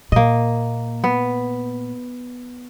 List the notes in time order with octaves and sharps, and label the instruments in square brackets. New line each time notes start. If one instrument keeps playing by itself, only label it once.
[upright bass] A#2 [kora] A#3 D#5
[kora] B3